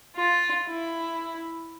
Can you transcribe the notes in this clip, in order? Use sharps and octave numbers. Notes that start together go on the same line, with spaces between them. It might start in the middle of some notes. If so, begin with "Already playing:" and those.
F4
E4